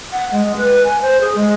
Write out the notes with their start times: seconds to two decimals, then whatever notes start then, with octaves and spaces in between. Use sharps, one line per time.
0.13 F#5
0.32 G#3
0.57 B4
0.84 G#5
1.02 C5
1.21 G#4
1.35 G#3